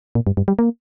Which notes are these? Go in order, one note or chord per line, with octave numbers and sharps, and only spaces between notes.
A#2
G2
G2
G3
A#3